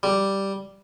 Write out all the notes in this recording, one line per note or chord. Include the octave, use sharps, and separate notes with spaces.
G3